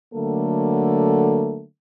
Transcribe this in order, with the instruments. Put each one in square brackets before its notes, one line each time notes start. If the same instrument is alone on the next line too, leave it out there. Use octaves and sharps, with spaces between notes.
[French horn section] D3 F#3 A3 A#3 A4